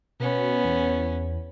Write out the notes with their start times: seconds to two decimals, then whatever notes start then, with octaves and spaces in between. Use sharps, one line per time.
0.20 B2 B3 C#4
0.65 E2